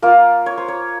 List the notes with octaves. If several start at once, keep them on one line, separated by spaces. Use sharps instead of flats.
A#3 F4 A#4
C#5
C5
C#5